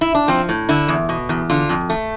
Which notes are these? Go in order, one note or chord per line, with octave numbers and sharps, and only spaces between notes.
E4
D4
F3 C4
A2
D3 E4
E2
B2
E2
D3 F4
F2
A3